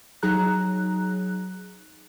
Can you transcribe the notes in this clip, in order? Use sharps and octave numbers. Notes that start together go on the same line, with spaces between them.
F#3 D#4 G#4 A#5 F#6